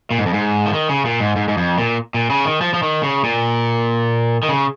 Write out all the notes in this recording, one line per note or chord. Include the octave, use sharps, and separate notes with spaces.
A#2
G#2
F2
G#2
F3
D#3
C#3
A#2
G#2
G#2
G#2
F2
A#2
A#2
C#3
D#3
F3
F3
D#3
C#3
A#2
D#3
C#3